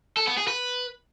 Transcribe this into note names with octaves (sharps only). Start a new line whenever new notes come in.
A4
B3
G#4
B4